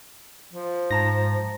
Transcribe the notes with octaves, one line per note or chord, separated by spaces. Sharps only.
F3
G#2 A5 A#5 A#6